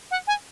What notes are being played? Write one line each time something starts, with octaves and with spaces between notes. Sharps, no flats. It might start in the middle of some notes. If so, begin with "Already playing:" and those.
F#5
G#5